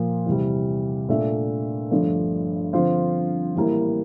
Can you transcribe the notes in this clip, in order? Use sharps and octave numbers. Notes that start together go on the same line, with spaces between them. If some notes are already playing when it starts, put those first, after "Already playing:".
Already playing: A#2 F3 A#3
E2 C3 G3
A#2 A3 D4 A4 E5
G1 G2 F3 A3 D4
D3 F3 C4 F4 C5
A1 A2 G3 A#3 E4